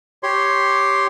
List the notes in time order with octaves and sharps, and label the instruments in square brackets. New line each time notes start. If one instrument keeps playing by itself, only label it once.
[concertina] G4 C#5 C6